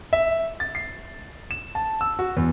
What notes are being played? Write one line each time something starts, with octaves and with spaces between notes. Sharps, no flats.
E5
A6
C7
E7
A5
E6
F#4
E2